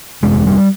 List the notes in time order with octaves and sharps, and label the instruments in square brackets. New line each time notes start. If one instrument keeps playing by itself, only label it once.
[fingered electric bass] G1 F2 C3 G#3
G3